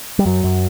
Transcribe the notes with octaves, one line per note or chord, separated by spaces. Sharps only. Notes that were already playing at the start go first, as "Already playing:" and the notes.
G3
F#2 F#3
F#2